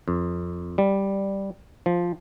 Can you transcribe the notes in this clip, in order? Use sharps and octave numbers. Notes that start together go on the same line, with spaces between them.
F2
G3
F3